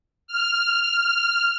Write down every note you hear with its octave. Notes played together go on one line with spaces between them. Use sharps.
F6